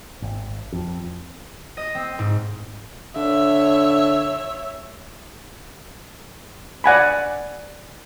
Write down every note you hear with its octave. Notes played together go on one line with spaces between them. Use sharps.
G#1
F2
D#5
C4
G#2
D3 C#5 E5
D5 F#5 G#5 B5